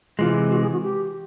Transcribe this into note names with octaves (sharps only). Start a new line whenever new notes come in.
C3 E3 G#3 F4
F#4
G#4
F#4
G4